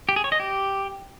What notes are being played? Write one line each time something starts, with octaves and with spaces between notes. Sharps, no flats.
G4
G#4
C#5
D#5
G4